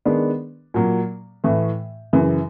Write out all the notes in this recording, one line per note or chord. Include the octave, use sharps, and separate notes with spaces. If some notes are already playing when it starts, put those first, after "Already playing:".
D#3 G#3 B3 D4
A#2 F#3 A#3
A2 E3 A3
F#2 C#3 E3